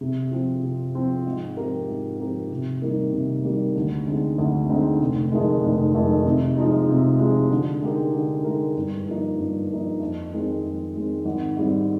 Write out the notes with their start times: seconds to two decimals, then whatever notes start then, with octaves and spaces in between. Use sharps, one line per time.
0.01 C3
0.31 F3 C4
0.63 C3
0.95 F3 C4
1.26 G#2
1.57 F3 C4 G4 A#4
1.88 G#2
2.20 F3 C4 G4 A#4
2.51 C3
2.82 D#3 G3 A#3
3.13 C3
3.44 D#3 G3 A#3
3.76 D2
4.07 D3 G#3 C4 D#4
4.38 D2
4.70 D3 G#3 C4 D#4
5.01 F1
5.32 F2 D#3 G#3
5.63 F1
5.95 F2 D#3 G#3
6.26 C3
6.57 F3 G#3 D#4
6.88 C3
7.19 F3 G#3 D#4
7.50 D3
7.82 G#3 D#4 G4 A#4
8.13 D3
8.44 G#3 D#4 G4 A#4
8.76 G2
9.07 F3 A#3 D#4
9.39 G2
9.69 F3 A#3 D#4
10.00 F2
10.32 D#3 G#3 C4
10.63 F2
10.94 D#3 G#3 C4
11.25 G#1
11.57 G#2 G3 C4